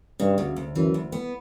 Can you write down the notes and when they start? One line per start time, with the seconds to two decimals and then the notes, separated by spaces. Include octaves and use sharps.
0.20 G2 C#3
0.38 D2
0.56 D2
0.75 F#2 E3
0.94 D2
1.12 B3